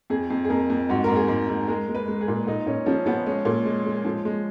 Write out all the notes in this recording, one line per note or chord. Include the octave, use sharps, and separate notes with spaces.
F2 G#4
F2
G#4
F2 A#4
F2
G#2 F#4
G#2 A#4
G#4
G#2
G#2
G#3 A#4
G#3
B4
G#3
G#4
A#2
A#2 D#4
A#2 C#4
F3 C#4
F3 B3
G#3 C#4
A#2
G#3
G#3
F3
G#3